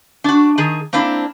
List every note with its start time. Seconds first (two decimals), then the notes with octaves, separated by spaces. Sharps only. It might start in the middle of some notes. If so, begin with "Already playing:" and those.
0.24 D4 F#4
0.58 D#3 G#4
0.93 A#3 C4 D4 E4